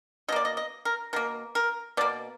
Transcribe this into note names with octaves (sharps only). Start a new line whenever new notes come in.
B2 A#3 D5 D#5
D#5
D#5
A#4
B2 A#3 A#4
A#4
B2 A#3 D5